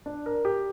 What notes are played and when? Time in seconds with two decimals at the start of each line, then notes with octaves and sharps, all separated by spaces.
0.06 D4
0.26 A#4
0.45 G4